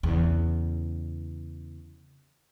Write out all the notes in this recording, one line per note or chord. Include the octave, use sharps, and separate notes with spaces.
E2 C#3